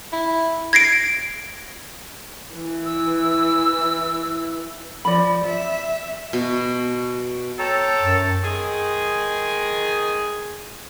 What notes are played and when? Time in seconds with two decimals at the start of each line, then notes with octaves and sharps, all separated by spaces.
0.13 E4
0.73 G#6 A#6 C7 D7
2.54 E3
2.85 E6
5.05 F3 D5 B5
5.45 E5
6.33 B2
7.59 A4 C#5 G5 A#5
8.01 F#2
8.43 D#3 G#3 G#4